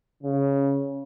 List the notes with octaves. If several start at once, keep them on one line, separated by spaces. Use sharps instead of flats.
C#3